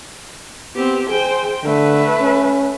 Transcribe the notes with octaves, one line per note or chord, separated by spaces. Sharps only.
B3 C4 G4
G#4 C5 G5
D3 A3 B4
C#4